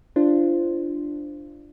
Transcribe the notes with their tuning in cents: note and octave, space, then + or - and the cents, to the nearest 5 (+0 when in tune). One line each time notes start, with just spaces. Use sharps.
D4 +0 F4 -30 C5 +0